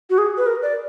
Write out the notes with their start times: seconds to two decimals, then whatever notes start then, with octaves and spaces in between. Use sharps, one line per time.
0.10 F#4
0.18 G#4
0.38 B4
0.47 A#4
0.62 D5